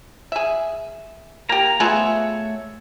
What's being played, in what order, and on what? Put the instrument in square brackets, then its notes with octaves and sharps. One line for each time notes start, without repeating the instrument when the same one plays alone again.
[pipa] G#4 E5
[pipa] A#3 G4 [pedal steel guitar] A#5
[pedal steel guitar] A3 C#5 E5 [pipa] B3 F4 G#4